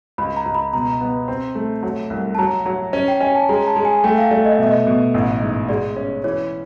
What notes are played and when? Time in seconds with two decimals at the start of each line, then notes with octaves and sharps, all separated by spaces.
0.18 C#2 B5
0.36 A#5
0.46 C#2
0.55 B5
0.73 B2 A#5
1.01 B3
1.28 C4
1.55 A3
1.83 F#3
2.10 C2
2.35 A5
2.38 F#3 A#5
2.66 F#3
2.93 C#4
3.08 G5
3.20 C#4 G#5
3.36 A5
3.49 G#3 A#5
3.67 A5
3.76 G#3
3.85 G#5
4.04 A3 G5
4.18 F5
4.31 A3 D5
4.45 D#5
4.55 B2 E5
4.67 D#5
4.86 B2
5.14 A1
5.41 G#2
5.69 G#3 D5
5.96 C#4
6.24 E3 C#5